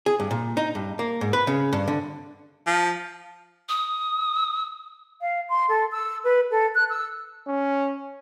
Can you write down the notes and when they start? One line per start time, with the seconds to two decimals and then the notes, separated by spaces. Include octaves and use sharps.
0.06 G#4
0.20 G2
0.31 A#2
0.57 D#4
0.75 G2
0.99 A#3
1.21 G#2
1.33 B4
1.47 C#3
1.73 G2
1.88 D3
2.66 F3
3.69 D#6
5.20 F5
5.49 C6
5.68 A4
5.91 E6
6.24 B4
6.50 A4
6.75 F#6
6.89 E6
7.47 C#4